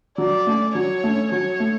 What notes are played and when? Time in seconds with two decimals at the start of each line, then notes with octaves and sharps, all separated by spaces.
0.18 F#3 D5
0.47 A3 C#4
0.75 F#3 C#5
1.04 A3 C#4
1.32 F#3 C#5
1.60 A3